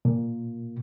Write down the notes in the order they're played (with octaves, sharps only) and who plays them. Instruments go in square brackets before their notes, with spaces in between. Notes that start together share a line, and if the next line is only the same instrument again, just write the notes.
[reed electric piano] A#2